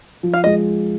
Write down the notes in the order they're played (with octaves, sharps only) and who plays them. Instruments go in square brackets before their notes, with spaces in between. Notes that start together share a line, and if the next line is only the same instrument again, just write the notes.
[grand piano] F3
[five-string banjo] F5
[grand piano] G#3 [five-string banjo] D#5